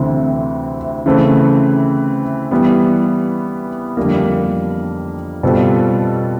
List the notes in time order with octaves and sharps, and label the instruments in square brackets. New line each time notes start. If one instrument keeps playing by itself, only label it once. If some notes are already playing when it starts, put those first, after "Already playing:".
Already playing: [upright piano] D2 C3 E3 A3 C4
C#3 E3 A3 C4
E3 G3 B3
F2 D3 G3 A#3
B2 G3 C4 F4 A4